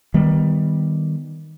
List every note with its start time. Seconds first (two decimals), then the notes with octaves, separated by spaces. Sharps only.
0.14 D#3 G3 B3